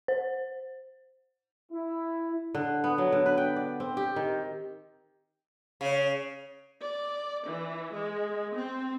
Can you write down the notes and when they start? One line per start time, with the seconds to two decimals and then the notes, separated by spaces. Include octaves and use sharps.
0.08 C5
1.72 E4
2.55 D3
2.84 B3
2.98 F#3
3.12 D3
3.26 B4
3.37 G5
3.56 D5
3.80 C4
3.97 G4
4.16 D#3
5.81 C#3
6.81 D5
7.46 E3
7.93 G#3
8.54 C4